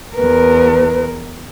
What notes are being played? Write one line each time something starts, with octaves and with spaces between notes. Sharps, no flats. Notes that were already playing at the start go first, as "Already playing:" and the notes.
E2 A#4 B4